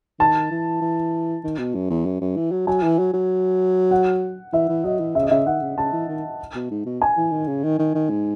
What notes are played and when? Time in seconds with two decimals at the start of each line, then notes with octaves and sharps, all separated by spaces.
0.19 D#3 A5
0.51 E3
0.81 E3
1.44 D#3
1.59 B2
1.75 F#2
1.90 E2
2.06 F#2
2.21 F#2
2.36 E3
2.52 F#3
2.67 F#3 G#5
2.83 E3
2.99 F#3
3.14 F#3
3.91 F#5
4.53 E3 E5
4.69 E3
4.84 F#3 D#5
5.00 E3
5.15 C#3 E5
5.23 D#5
5.31 C#3 E5
5.46 D#3 F#5
5.62 C#3
5.77 C#3 A5
5.93 E3
6.09 D#3
6.55 B2
6.71 G#2
6.86 B2
7.02 G#5
7.17 E3
7.32 D#3
7.47 C#3
7.63 D#3
7.79 D#3
7.95 D#3
8.10 G#2